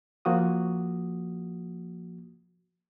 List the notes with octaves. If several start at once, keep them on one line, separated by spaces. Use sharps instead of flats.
F3 A#3 F#4 D#6